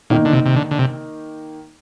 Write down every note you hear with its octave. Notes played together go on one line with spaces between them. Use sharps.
A#2 D#3 A#3 D#4
D3
C3
C3
D3
D3
C3